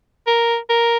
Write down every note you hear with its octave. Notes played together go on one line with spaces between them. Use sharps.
A#4
A#4